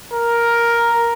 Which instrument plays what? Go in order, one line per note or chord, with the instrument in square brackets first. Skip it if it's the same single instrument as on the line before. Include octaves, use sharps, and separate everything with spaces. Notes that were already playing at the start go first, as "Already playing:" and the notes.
[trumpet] A#4